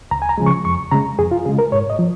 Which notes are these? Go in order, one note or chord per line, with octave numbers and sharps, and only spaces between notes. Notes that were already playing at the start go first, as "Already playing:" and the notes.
C#2 A#5
G#5
A#5
C#3 F3 G#3
C#6
F2 C#6
C#3 G#3 A#5
F2 G#4
F4
C#3 G#3 G#4
A#4
G#2 C#5
D#5
F3